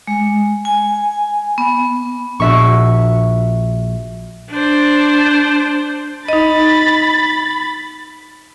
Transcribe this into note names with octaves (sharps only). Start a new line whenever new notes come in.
G#3
G#5
B3
A#1 F#4 E5 C#6
D4 C5
D#4 D#5 B5 A6